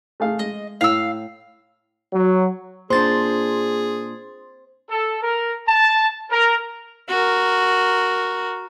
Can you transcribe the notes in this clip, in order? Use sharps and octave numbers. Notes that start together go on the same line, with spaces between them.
A3 G#4 F5
G#3 D#5
A2 F5 E6
F#3
A#2 D4 G#4 C5 C6 A6
A4
A#4
A5
A#4
F#4 A#4